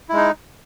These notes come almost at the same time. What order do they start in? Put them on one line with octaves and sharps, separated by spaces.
E4 G#3 D#4